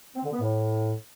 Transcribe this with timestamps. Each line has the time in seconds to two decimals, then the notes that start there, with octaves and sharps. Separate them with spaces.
0.16 C4
0.24 D3
0.33 B3
0.41 A2